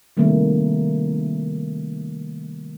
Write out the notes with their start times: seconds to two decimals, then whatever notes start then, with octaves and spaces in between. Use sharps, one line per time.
0.17 C3 D#3 G3 A3 A#3